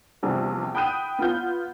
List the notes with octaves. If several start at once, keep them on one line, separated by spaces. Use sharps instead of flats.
A#1 E2 C3 G3
G5 B5 D#6 F#6 G6 D#7
B3 F4 G6